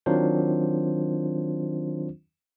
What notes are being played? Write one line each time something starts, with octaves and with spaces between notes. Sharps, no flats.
D#3 F#3 C4 D4 F4 C5